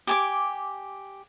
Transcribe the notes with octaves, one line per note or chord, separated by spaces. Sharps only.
G4 G#5 D6